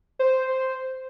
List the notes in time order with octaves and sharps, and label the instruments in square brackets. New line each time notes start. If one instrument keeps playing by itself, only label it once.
[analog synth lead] C5